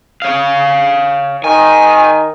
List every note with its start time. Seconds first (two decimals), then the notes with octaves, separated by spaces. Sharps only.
0.22 C#5 F5
1.44 D#3 G#5